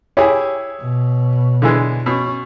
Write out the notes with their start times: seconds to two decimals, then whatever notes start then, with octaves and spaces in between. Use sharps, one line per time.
0.17 E4 G4 G#4 C#5
0.81 B2
1.62 D3 E3 G#3
2.06 B2 C#4